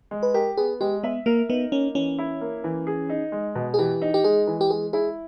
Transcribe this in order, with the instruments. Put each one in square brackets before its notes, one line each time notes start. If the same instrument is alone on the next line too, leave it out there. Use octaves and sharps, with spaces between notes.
[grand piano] G#3
[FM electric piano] B4
[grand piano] G4 [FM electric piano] A#4
[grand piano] B3 [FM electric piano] G#4
[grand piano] G#3 [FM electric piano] G4
[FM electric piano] B3 [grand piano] E5
[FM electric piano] A#3 [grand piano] A#4
[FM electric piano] B3 [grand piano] D#4
[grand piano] A#3 [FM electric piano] C#4
[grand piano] E3 [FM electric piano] C#4
[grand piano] E4
A#3
E3
G#4
D#4
G#3
B2
[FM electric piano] G#4
[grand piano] E3 [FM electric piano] G4
[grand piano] D#4
[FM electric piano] G4
[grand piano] G#3 [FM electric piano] G#4
[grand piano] E3
[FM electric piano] G4
[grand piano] G#3 [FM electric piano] G#4
[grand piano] E4 [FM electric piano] G#4